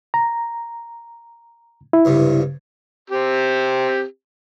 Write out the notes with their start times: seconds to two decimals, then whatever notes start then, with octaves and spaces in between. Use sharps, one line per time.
0.14 A#5
1.93 E4
2.05 C#2 G2 C3
3.10 C4 G4